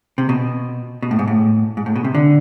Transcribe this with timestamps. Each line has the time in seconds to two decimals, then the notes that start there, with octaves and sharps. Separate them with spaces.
0.18 C3
0.29 B2
1.02 B2
1.11 A2
1.19 G#2
1.28 A2
1.77 G#2
1.86 A2
1.96 B2
2.04 C3
2.15 D3